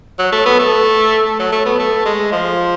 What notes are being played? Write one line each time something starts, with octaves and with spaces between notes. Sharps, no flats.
F#3
A3
B3
A3
A3
F#3
A3
B3
A3
G#3
F3